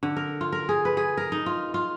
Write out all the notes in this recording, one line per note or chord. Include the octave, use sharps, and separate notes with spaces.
D3
A#4
F4
A#4
G#4
B4
G#4
A#4
D#4
F4
F4